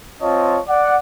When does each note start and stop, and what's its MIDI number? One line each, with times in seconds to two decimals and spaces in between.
0.22 0.59 60
0.22 0.59 65
0.22 0.59 73
0.22 0.59 75
0.22 0.59 81
0.68 0.97 74
0.68 0.97 78